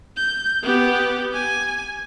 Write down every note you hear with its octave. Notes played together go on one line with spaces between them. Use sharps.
G6
B3 G4
G#5